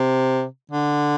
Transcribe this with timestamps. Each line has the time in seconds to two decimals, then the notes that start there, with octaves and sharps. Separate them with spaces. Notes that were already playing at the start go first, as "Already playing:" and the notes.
Already playing: C3
0.71 D3